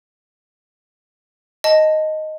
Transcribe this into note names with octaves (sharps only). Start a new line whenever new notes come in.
D#5 A5